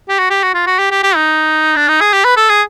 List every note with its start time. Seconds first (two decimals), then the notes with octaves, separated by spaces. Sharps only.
0.09 G4
0.19 F#4
0.30 G4
0.43 F#4
0.54 F4
0.67 F#4
0.79 G4
0.91 G4
1.03 G4
1.16 D#4
1.76 D4
1.88 D#4
2.01 G#4
2.13 G4
2.25 B4
2.37 A4
2.50 G#4